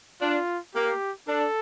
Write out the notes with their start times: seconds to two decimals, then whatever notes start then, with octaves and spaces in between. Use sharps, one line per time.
0.21 D4 F4
0.74 A#3 G4
1.28 D4 A4